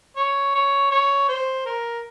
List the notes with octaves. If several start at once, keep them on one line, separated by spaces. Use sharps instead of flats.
C#5
C#5
C#5
C5
A#4